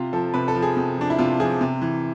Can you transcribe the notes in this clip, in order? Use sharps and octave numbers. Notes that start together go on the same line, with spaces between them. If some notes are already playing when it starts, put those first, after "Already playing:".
Already playing: C3 F4
F3 A4
C3 B4
A4
F3
G#4
C3
F3 D4
E4
C3 F4
F3 G#4
C3
E3